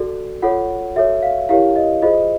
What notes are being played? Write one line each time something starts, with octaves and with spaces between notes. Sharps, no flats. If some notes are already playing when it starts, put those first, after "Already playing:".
Already playing: F#4 A4 D5
F4 A4 C#5 F#5
F#4 A4 C#5 E5
F5
E4 G4 A#4 C#5 F5
D#5
F4 G#4 C5 D#5